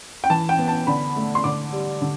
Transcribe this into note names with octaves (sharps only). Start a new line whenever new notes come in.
G5
E3 A5
G5
B3
A5
D3 B5
A3
C6
D3 D6
G3
D3